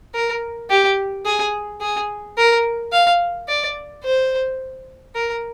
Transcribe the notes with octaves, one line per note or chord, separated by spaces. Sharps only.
A#4
G4
G#4
G#4
A#4
F5
D5
C5
A#4